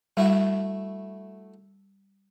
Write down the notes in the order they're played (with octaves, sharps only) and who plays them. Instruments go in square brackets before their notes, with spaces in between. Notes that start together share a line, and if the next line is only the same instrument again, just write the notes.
[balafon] G3 [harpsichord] A3 E4 F#4